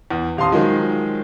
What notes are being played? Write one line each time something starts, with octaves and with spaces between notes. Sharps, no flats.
E2
D#1 F5 A5 C6 D#6
D#3 F3 F#3 G#3